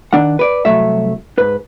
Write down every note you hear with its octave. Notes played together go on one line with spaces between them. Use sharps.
D#3 D4 F#5
B4 D5
C2 F#3 A3 E5
G#2 B4